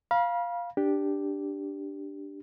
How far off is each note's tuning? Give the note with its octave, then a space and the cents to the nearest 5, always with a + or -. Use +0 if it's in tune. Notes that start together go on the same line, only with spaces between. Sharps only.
F5 +0 B5 -40
D4 +0 G4 +0